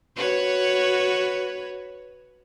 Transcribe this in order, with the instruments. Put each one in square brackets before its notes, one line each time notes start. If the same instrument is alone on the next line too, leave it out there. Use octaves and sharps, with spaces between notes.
[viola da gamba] F#4 B4 C#5